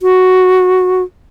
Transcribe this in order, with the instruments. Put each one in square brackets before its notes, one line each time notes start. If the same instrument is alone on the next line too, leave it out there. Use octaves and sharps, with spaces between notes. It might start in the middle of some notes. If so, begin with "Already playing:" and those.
[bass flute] F#4